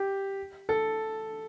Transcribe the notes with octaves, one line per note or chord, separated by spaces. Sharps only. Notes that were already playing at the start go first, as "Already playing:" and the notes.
Already playing: G4
A4